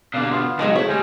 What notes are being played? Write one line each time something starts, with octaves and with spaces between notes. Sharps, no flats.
B2 D3 A#3 D5 F5
B3 F4
A#2 C#3 F#3 G#3 D#4 G4 D#5
A3 C4 E4 C#5 E5
D2 G3 C5 D#5 G#5